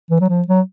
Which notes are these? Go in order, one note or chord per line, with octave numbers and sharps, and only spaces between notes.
E3
F#3
F3
F#3